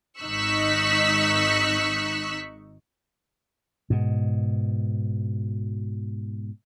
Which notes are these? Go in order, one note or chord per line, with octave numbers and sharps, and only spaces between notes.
G#1 D#4 C#6 E6 F#6 B6
G#2 B2